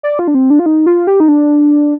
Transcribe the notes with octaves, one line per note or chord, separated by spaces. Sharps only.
D5
F4
D4
C4
D4
F4
D#4
F4
G4
D#4
D4